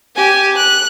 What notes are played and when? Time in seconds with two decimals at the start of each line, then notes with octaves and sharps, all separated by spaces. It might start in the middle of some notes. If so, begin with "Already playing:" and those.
0.16 G4 G#5
0.57 F#6